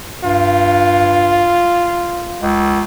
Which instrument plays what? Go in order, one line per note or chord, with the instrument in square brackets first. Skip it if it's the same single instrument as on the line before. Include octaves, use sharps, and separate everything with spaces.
[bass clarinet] G2 [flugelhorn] F4
[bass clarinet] C#2